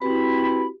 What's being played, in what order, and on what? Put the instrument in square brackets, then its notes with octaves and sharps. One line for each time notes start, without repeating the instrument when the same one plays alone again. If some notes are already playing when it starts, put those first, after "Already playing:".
[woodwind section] C4 E4 B5 [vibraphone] F#4 G4 B4